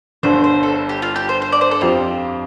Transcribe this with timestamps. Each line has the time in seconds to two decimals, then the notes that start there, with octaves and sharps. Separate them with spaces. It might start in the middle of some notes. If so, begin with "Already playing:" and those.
0.23 G1 G2 D3 C5
0.44 C5
0.63 A4
0.89 G4
1.02 F4
1.16 G4
1.29 C5
1.42 C5
1.52 D5
1.61 C5
1.71 A4
1.81 F2 F3 C4 F4 G4